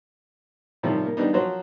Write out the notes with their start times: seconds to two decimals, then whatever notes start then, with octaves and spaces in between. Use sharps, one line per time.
0.83 A2 C3 D#3 F3 G3
1.05 A#3
1.17 D3 G3 B3 D4 D#4
1.33 F3 F#3 C5